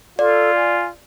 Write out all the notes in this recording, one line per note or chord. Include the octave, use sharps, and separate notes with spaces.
F4 A4 D5
G#5